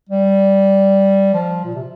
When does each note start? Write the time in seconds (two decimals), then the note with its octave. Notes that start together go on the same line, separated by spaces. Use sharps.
0.09 G3
1.34 F3
1.65 A#2
1.75 C3